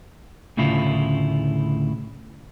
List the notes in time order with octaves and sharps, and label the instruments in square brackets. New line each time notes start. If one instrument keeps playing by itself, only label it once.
[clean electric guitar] D2 A2 C#3 E4 F4